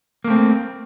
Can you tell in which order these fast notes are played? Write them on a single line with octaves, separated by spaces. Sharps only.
A#3 A3 C4